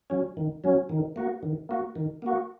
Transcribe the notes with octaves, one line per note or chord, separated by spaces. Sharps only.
F#3 C#4
D#3
F#3 C#4
D#3
A#3 F#4
D#3
A#3 F#4
D#3
A#3 F#4